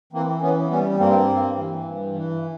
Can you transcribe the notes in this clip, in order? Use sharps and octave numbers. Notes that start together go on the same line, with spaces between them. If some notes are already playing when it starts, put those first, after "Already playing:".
E3 A#3 C4
E3 B3 C#4
G3 B3 C#4
G2 A#3 C4
G2
E3
G2
E3